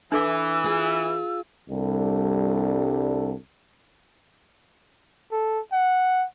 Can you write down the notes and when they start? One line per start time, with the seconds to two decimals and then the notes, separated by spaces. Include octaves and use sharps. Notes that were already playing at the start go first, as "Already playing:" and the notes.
0.12 E3 D4 A4 D6 E6
0.64 F4 G#4
1.70 C2 G3 D4 A4
5.32 A4
5.73 F#5